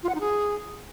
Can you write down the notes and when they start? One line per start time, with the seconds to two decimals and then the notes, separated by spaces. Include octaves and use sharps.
0.03 F4
0.09 F#5
0.15 D#4
0.20 G#4